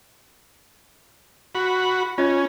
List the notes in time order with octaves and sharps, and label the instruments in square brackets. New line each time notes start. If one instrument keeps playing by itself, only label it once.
[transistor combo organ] F#4 B5
[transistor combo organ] C#4 [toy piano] F4 C#5 D#5